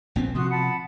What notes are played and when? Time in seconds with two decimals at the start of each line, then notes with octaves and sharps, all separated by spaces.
0.16 A#1 B3 C4
0.35 C3 F3 F#4 C6 D#6
0.50 F#5 A5 B5